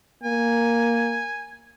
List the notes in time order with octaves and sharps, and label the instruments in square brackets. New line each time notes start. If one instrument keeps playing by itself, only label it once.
[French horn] A#3 [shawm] G#5